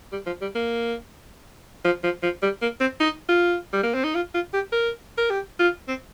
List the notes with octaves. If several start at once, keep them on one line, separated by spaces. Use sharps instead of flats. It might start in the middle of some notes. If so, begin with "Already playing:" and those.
G3
F3
G3
A#3
F3
F3
F3
G3
A#3
C4
D#4
F4
G3
A#3
C4
D#4
F4
F4
G4
A#4
A#4
G4
F4
C4